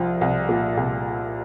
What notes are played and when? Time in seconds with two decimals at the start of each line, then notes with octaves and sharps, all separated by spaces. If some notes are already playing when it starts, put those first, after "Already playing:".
Already playing: C2 F3 F4
0.21 C2
0.49 A#2
0.77 C2